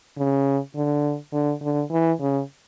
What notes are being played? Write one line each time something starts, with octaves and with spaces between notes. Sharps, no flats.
C#3
D3
D3
D3
E3
C#3